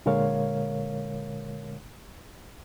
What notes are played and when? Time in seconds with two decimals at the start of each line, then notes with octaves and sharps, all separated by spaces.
0.06 A#2 D3 G#3 A#4 C#5 F5